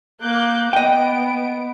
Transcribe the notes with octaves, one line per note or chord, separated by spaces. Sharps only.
A#3 D6 F#6 G6
B3 D#5 G5 D7